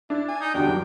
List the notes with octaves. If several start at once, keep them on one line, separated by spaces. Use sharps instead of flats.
D4 E4
G#5
D#4
E2 D3 G3 D4 F#4 G4 G5
F#2 E3